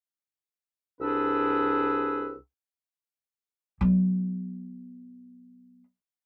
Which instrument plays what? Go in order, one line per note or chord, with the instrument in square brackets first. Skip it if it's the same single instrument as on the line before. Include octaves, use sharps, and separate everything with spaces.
[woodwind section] C2 D4 G#4 B4 E6
[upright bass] F#3 B3